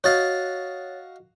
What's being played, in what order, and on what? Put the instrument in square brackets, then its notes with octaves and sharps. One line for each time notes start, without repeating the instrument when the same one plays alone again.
[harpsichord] F#4 D#5 F5 [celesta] C#5 A6